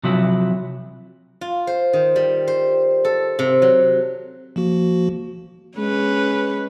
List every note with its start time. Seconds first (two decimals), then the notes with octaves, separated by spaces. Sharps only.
0.04 C3 F3 F#3 E4
1.41 F4
1.67 C5
1.93 D#3
2.16 G3
2.47 C5
3.05 A4
3.39 C3
3.62 F#3
4.56 F3 A#3 F#4
5.78 G#3 C#4 B4